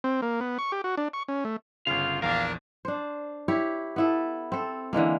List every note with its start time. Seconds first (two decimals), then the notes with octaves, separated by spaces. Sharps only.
0.04 C4
0.22 A#3
0.41 B3
0.59 C#6
0.72 G4
0.84 F#4
0.97 D4
1.13 C#6
1.28 C#4
1.45 A3
1.87 G1 C#3 F4 F5
2.22 A#1 E2 A#3 D4 A#4 F5
2.85 D4 C5
3.48 E4 G4 C#5
3.96 B3 E4 A4
4.52 C4 A4
4.93 D3 E3 G#3 A#3